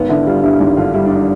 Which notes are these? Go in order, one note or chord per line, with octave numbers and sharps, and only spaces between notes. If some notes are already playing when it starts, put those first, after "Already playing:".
Already playing: G#1 B3
D3 E4
G3 F4
G2 E4
G#1 E4
D3 F4
G3 E4
D4
D#4